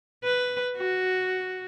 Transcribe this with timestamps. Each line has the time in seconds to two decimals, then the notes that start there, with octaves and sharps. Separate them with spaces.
0.24 B4
0.76 F#4